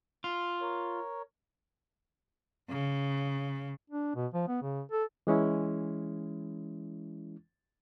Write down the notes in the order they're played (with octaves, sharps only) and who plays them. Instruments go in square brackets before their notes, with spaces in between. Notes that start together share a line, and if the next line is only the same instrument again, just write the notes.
[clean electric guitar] F4
[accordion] A#4 C#5
[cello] C#3
[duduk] D4
B2
F3
B3
C#3
A4
[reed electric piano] E3 G#3 C#4 E4